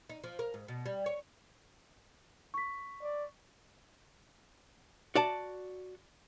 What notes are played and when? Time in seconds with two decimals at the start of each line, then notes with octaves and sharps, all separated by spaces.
0.09 D#4
0.24 F3
0.39 A#4
0.54 G#2
0.68 B2
0.86 G3
1.06 C#5
2.54 C#6 B6
3.02 D5
5.15 F#4 D5 A5